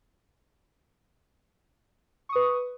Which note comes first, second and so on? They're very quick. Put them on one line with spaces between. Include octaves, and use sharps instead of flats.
C#6 D#6 B4